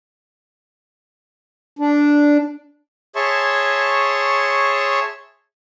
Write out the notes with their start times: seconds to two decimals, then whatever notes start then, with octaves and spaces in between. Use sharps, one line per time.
1.79 D4
3.16 G#4 C#5 E5 A5 C6 C#6